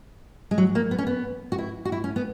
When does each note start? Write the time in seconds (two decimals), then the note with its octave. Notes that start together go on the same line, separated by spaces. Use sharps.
0.51 G#3
0.58 F#3
0.75 A#3
0.91 B3
0.98 C#4
1.07 B3
1.52 F#4
1.58 E4
1.85 F#4
1.92 E4
2.04 C#4
2.16 B3